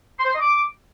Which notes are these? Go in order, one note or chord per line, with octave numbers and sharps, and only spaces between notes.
C6
C5
C6
D#5
D6